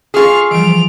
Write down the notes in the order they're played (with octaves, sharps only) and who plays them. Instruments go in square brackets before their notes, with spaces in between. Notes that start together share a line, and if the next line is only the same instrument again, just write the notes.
[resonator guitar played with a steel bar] F4 G#4 [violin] C#6 F6
[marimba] E3 F3 G3 [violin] D7 F7